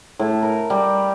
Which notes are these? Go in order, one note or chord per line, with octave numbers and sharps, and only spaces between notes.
A2
A#4
G3